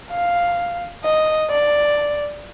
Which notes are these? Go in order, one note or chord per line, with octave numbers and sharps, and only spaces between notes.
F5
D#5
D5